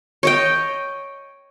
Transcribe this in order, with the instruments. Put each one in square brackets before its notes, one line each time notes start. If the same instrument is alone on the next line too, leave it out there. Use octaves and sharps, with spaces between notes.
[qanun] C#5 D#5 G5